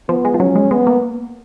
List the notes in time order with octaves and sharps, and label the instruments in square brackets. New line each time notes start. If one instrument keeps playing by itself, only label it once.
[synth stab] F3 [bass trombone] B3
[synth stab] G#3
F3
[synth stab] F#3 [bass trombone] C#4
[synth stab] G#3
[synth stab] G#3 [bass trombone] B3
[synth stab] A#3